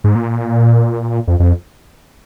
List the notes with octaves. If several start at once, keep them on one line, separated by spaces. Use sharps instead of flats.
G#2
A#2
F2
F2